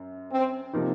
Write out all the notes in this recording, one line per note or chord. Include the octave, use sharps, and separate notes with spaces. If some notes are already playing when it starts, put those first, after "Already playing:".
Already playing: F#2
C4
C3 F3 A#3 D#4